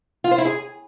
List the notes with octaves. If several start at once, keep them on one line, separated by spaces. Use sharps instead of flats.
F4
C5
E4
G#4